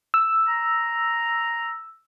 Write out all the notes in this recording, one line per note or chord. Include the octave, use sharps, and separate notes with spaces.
E6
A#5